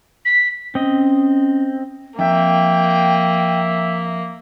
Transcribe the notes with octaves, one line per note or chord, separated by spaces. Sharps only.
B6
C4 C#4 D#5
F2 A#3 E5 G5